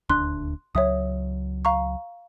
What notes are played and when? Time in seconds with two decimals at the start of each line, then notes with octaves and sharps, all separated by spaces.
0.10 D#1 D2 D4 C6 F#6
0.75 C#2 F#3 C#5 E5 D#6
1.65 F5 A#5 C#6